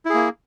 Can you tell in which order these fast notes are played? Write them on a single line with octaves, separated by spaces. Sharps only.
E4 G#4 A#3